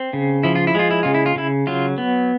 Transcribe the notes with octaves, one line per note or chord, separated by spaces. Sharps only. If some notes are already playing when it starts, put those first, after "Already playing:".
Already playing: C4
C#3
F3 E4
F4
E4
G#3 F4
E4
C#3 F4
E4
F4
C#3 E4
F#3 F4
B3